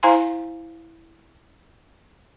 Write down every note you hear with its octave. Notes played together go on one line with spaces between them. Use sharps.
E4 C5 F5 G#5 A#5 C6